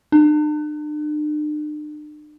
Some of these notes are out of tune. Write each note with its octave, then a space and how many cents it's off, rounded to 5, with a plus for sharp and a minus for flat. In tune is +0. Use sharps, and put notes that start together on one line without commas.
D4 +45